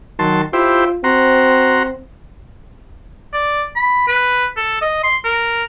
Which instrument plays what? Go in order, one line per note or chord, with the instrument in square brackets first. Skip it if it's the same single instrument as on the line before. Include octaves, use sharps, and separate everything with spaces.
[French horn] D#3 [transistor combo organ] F#3 A5 C6
[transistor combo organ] E4 G4 C5 [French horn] F4
[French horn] C4 [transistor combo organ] F#4 A#5 C6
[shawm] D5
B5
B4
A4
D#5
C6
A#4